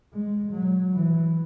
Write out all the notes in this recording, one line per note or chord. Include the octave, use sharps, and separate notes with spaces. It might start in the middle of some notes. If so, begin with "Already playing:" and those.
G#3
F#3
E3